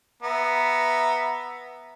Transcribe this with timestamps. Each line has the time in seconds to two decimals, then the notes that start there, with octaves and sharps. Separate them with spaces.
0.23 B3 E5 A#5